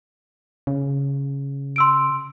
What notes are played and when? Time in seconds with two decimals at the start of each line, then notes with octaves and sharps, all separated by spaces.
0.67 C#3
1.76 C6 E6 D7